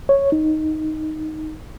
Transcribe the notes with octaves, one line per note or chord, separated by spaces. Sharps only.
C#5
D#4